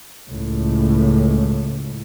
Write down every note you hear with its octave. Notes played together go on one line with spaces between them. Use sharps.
C#2 A2